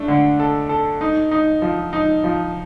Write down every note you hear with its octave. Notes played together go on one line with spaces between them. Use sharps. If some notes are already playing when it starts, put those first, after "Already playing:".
Already playing: A3 D4
D3
A4
A4
D#4
D#4
F3
D#4
F3